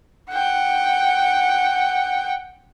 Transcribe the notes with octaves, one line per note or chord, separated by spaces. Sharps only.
F#5 G5